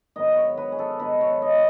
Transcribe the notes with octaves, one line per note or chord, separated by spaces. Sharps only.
G#2 D#3 F#3 B3 D#5
C#5
B4
G#4
A4
G#2 D#3 F#3 B3 B4
C#5
D#5